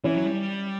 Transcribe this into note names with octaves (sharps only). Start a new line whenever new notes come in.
E3 C#4 E4
F#3
G3